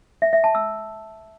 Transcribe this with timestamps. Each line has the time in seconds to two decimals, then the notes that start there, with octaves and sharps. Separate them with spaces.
0.22 E5
0.33 E5
0.44 A5
0.55 E6